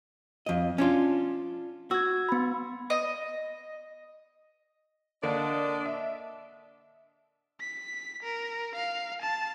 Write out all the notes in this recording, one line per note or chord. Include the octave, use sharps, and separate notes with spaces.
F2 D#5
C#4 D4 F4
F#4 E6 G#6
B3 B5
D#5
D3 A#3 D4 D5 D#5
E5
B6
A#4
F5
A5